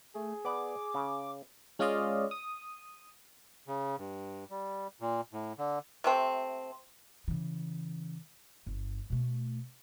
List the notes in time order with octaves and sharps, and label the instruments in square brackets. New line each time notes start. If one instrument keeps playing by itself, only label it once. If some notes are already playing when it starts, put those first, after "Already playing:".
[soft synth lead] A3 [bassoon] G#4
[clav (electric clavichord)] B3 D5 [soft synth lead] D6
[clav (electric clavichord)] C#3
[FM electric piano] G#3 C#4 F4 D5 D#5 F5
D#6
[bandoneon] C#3
G2
G3
A#2
A2
D3
[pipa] C3 A3 C4
[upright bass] C#3 E3
G1
B2 A3